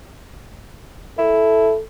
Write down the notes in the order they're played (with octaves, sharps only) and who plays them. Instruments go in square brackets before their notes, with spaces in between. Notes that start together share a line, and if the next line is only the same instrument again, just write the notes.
[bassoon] E4 [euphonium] A4